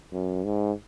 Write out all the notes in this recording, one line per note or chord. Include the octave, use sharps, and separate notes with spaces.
F#2
G#2